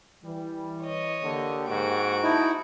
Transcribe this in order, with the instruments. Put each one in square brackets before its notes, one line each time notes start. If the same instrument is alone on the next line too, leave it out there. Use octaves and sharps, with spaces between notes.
[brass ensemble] E3 G3
[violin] C#5 D#5
[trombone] D3 [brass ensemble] A#3 G4
[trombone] G#2 [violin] F#4 D7
[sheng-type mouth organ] D#4 E4 [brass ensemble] A5